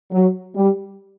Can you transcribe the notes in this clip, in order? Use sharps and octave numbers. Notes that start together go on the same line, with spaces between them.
F#3
G3